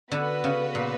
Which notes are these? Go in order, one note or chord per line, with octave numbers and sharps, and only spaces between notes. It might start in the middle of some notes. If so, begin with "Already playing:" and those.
D3 B3 F#4 B4
C#3
A#2